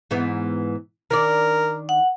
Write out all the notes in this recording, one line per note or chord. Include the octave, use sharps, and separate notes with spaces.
G#2 E3 B3
D#3 D4 A#4 D5
F#5